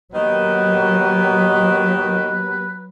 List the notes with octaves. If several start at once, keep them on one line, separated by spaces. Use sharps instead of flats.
D#3 F#3 A#3 B3 G4 B4